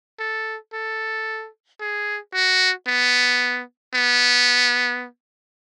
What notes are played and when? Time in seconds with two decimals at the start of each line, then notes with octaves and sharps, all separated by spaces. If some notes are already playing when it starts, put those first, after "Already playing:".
0.19 A4
0.73 A4
1.81 G#4
2.34 F#4
2.87 B3
3.95 B3